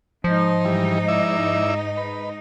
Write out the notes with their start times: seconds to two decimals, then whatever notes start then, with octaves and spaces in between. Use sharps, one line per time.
0.24 G#2 F3 D#4 C5
0.65 E3 G3
1.08 E4 D5 E5
1.97 B4